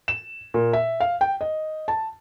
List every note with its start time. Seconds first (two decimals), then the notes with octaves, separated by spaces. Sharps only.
0.08 E7
0.54 A#2
0.73 E5
1.00 F5
1.21 G5
1.41 D#5
1.88 A5